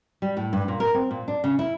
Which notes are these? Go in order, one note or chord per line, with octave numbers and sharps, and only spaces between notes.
G3
A2
G2
A#2
A#4
C4
A#2
D4
C#3
E4